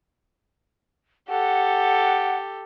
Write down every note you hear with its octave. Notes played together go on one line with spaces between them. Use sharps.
G4 A4 F#5